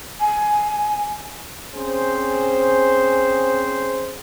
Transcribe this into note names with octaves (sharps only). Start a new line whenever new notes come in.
G#5
C4 C#4 G#4 C5